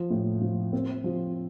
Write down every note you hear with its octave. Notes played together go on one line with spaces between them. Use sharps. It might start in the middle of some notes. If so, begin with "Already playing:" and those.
Already playing: F3
A2
F3
C4
F3